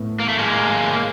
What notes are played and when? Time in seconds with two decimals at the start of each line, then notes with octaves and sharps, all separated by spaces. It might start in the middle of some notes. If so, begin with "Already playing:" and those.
Already playing: A2 B3
0.20 A#3
0.29 A3
0.38 G#3 A#3